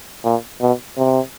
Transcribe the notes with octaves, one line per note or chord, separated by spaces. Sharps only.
A#2
B2
C3